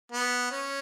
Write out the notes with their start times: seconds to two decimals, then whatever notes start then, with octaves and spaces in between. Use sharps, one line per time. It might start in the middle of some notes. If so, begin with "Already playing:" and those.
0.12 B3
0.51 C#4